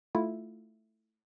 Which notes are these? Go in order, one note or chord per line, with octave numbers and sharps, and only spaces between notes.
A3 E4 F4